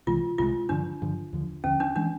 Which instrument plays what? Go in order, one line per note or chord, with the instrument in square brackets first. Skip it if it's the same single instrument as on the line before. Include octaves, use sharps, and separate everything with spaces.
[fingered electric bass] C2 C3 E3 G#3 [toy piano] F4
[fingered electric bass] C2 C3 E3 G#3 [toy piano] F4
[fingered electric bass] G2 D3 F3 [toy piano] D4
[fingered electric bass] G2 D3 F3
D#2 D3 F3
[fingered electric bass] D#2 D3 F3 [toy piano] C#4
[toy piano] D4
[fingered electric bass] E3 G#3 C#4 [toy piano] D4